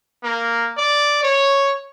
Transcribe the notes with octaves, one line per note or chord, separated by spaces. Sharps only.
A#3
D5
C#5